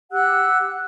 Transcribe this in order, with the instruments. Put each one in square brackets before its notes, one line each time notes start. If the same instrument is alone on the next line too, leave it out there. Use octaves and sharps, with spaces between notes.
[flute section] G4 F#5 E6 F#6